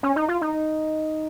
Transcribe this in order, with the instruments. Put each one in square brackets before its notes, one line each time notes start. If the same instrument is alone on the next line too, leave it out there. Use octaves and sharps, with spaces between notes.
[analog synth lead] C#4
D#4
F4
D#4